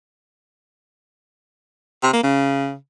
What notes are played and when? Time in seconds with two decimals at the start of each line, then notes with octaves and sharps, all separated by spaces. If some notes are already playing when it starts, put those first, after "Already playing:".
2.03 C3
2.13 A#3
2.23 C#3